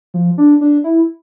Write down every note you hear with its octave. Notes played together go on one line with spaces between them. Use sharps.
F3
D4
D4
E4